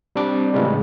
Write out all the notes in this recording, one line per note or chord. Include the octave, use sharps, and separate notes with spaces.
G3 C4 D4 D6
A2 C#3 E3 G3 G#3